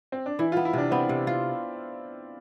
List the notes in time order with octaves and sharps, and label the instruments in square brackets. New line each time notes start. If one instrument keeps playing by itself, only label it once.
[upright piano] C4
D4
[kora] E3 [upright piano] E4
[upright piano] F4
[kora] B3
[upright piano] E4
[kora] C3 [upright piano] D4
[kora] B3 [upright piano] C4
[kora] C3
F4